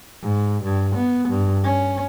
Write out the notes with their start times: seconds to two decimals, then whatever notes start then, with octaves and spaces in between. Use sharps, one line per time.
0.23 G#2
0.64 G2
0.96 B3
1.29 G2
1.64 C#4